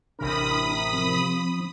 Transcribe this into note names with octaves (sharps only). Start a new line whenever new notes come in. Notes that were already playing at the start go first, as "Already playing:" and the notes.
A1 C3 D4 A#4 B5 D#6
F3 C4